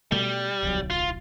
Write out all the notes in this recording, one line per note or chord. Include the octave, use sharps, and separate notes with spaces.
B2 G3 A3
D1 B1 F#3
F4